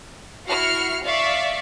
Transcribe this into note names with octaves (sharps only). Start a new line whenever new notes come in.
E4 F#4 E5 F6 C7 C#7
D5 E5 F5 C#6